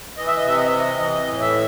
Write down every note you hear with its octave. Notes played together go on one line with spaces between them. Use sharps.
E3 D#5
E5
D#5
C3 E5
D#5
E5
E3 D#5
E3 D#5
A2
E5